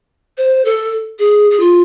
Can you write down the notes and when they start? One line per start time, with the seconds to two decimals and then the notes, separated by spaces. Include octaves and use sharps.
0.37 C5
0.65 A4
1.19 G#4
1.51 G#4
1.60 F4